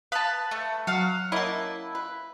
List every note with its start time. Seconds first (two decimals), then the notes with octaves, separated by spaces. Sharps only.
0.12 B4 F5 A5 D#6 B6
0.51 A3
0.87 F#3 F5 F#5
1.32 A#3 C#4 E4 D#5 A5
1.95 B4